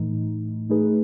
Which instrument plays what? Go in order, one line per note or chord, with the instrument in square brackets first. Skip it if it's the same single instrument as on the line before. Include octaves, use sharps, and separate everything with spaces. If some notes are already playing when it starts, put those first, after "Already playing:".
Already playing: [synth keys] A2 E3 A3 D#4
A3 D#4 G#4 B4